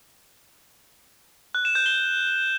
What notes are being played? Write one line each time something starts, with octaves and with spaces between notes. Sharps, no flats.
F#6
E7
G6
G7